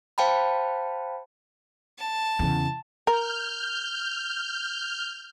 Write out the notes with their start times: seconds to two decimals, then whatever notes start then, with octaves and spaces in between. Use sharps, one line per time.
0.18 C5 F5 G5 A5 B5
1.99 A5
2.39 E2 C#3
3.07 A#4 F6 G6